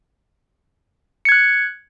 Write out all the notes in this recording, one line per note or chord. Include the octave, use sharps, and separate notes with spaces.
F#6 G#6 C#7